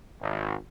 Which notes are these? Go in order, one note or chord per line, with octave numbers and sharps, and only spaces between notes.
G#1